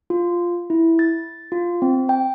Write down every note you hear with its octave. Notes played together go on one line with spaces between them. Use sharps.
F4
E4
A6
F4
C4
G5